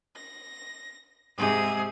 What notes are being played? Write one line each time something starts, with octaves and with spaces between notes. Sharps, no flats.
A#6
G#2 C3 G#4